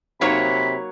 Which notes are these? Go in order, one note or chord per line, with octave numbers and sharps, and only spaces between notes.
C3 F#3 A#3 D#4 C5 C#5 A#5 B5